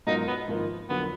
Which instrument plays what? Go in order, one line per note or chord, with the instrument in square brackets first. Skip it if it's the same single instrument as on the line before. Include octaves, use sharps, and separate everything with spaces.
[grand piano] G#2 F#3 B3 F4 A#4 [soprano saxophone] D#4
[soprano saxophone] B3
[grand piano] G#1 G#2 F3 A#3
[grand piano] F2 D3 F#3 A#3 [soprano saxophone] B3